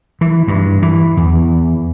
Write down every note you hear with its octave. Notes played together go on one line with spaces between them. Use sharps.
E3
G2
E3
E2